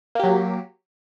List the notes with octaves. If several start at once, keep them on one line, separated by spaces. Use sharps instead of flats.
F#3 A#3 G4